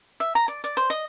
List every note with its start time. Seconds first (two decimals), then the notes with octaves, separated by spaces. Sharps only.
0.20 E5
0.35 A#5
0.48 D5
0.64 D5
0.77 C5
0.90 D#5